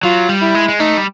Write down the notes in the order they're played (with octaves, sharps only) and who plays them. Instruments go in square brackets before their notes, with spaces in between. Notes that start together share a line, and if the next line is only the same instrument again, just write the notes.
[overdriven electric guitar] F#3 [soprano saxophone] F4
[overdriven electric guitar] G3
[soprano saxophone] E4
[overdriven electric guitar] G#3
G#3
[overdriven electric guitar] A3 [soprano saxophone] D#4
[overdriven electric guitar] G3